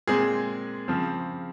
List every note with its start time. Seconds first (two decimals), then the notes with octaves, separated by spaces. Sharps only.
0.07 A#2 G#3 C4 G#4
0.88 C#3 F3 C4